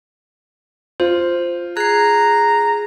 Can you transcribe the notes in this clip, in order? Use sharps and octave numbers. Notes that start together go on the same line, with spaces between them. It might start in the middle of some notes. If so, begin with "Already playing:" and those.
F4 C5
G#4 A#5 F#6 C7